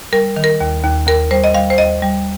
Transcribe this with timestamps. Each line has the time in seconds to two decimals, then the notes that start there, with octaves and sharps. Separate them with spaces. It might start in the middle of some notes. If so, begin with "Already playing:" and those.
0.13 G3 A#4
0.36 D#3
0.44 A#4
0.60 D#2
0.84 D#2
1.07 D#2 A#4
1.31 G3 C5
1.44 D#5
1.54 G3 F5
1.70 C5
1.78 D#2 D#5
2.02 G3